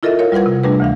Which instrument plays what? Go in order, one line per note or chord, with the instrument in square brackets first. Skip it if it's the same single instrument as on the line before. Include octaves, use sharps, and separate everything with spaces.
[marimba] E4 F4 A4 A#4 D#5 E5
A#4 C#5 F5
G3 F4 B4 F#5 G#6
C3
G3 A3 D4 G#4 B4
D2 E3 F5